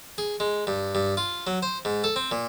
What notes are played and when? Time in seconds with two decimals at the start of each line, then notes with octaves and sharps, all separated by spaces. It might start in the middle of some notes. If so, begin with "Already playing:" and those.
0.18 G#4
0.40 G#3
0.67 G2
0.95 G2
1.17 F4
1.47 F#3
1.62 C5
1.85 G#2
2.04 A4
2.16 C4
2.31 A#2